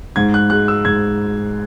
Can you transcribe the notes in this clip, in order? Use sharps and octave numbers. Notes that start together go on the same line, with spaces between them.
G#2 G#6
F#6
G#3 F#6
E6
G#2 G#6